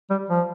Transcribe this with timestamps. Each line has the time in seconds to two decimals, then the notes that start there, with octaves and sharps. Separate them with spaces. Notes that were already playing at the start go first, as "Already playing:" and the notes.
0.10 G3
0.30 F3